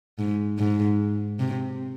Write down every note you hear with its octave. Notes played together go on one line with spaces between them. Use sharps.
G#2
G#2
C3